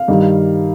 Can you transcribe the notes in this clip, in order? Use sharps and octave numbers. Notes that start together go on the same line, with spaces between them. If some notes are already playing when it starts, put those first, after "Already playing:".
Already playing: F5
G2 D#3 G3